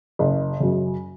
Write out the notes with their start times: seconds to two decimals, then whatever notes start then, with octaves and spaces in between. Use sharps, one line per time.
0.19 F#1
0.60 F#2 C#3